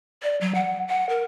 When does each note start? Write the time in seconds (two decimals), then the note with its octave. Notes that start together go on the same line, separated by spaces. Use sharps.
0.23 D5
0.41 F#3
0.55 F#5
0.88 F#5
1.09 A#4